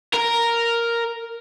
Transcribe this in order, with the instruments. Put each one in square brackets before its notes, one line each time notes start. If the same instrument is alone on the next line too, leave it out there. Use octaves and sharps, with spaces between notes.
[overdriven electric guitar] A#4